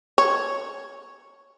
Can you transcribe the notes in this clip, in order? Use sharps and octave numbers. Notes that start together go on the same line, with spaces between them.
C#5